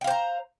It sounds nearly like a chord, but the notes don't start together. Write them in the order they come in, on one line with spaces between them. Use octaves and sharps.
G5 F5 C5 A#5